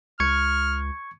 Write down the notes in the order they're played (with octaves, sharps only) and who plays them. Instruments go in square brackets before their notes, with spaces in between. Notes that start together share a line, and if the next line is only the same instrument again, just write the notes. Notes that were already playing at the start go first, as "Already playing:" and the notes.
[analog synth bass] C#2 [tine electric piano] C#6 G#6 C#7 [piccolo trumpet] F6